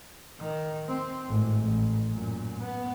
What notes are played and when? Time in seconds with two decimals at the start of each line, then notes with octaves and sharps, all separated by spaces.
0.40 D#3
0.88 C4
1.27 G#1 A2
1.62 A1
2.09 F#2 A#2
2.59 B3